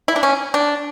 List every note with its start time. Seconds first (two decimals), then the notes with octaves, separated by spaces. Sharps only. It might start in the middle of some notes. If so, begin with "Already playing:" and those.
0.08 E4
0.16 D4
0.23 C#4
0.54 D4